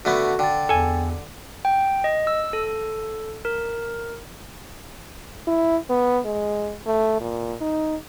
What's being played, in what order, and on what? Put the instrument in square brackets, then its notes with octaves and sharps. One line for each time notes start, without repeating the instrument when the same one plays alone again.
[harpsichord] D3 A3 B3 [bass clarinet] F#4 [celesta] A4
[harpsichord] D3 [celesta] G5 A6
[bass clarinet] E2 [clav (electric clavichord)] A4 G#5
[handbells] G5
D#5
E6
A4
A#4
[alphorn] E4
B3
G#3
A3
A#2
D#4